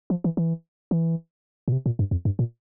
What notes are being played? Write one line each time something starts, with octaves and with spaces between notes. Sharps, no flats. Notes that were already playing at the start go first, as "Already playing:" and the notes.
F3
E3
E3
E3
A#2
C3
A#2
G2
F2
G2
A#2